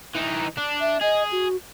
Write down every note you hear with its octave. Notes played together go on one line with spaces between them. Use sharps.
E3 D#4
D4
E5
G#4 D#5
F#4